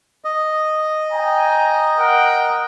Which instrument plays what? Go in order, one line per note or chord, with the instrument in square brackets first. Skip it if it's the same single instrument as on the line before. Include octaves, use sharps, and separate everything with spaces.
[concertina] D#5
[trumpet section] G5 G#5 A#5
A#4 F#5 G5